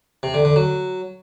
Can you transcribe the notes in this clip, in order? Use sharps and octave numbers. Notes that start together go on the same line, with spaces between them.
C3
D3
D3
F#3